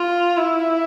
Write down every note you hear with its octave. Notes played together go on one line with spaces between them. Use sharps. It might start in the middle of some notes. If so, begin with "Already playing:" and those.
Already playing: F4
E4